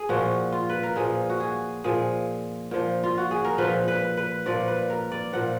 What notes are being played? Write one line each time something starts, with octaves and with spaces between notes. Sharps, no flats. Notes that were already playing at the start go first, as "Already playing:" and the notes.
Already playing: G#4
A#2 F3 F#4
F4
B4
A#4
A#2 F3 G#4
F#4
G#4
A#2 F3 G#4
A#2 F3
F4
F#4
G#4
A#4
A#2 F3 B4
B4
B4
A#2 F3 D5
B4
A#4
D5
A#2 F3 F#5